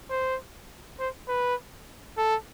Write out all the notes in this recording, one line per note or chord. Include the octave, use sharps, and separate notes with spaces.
C5
C5
B4
A4